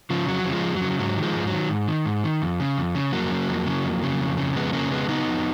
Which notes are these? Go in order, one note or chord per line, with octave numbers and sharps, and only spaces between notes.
C#3 F3
F2 F#3
C#3
F3 G#3
F2
C#3 F#3
G#2 F#3
D#3
F3 G#3
G#2
F#3
D#3
G#2
D#3
G#2
D#3
F2
C#3
F2
C#3
F2 F#3 A#3
C#3
F2
C#3
F2
C#3
F2
C#3
F2 G#3 B3
C#3 A#3 C#4
F2 G#3 B3
C#3 B3 D#4
F2